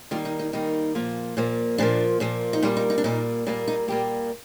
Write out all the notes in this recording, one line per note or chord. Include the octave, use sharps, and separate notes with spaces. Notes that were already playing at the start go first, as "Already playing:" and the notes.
D#3 G3 A#3 F4
D#4
D#4
D#3 G3 A#3 D#4
A#2 F3 A#3
A#2 F3 A#3
A#2 F3 A#3 D4
A#2 F3 A#3
D#4
A#2 G3 A#3 F4
D#4
D#4
D4
A#2 G3 A#3 D#4
A#2 G3 A#3 D4
D#4
A#2 G3 A#3 G4